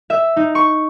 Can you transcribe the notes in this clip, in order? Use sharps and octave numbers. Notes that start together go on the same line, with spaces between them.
E5
D#4
C#6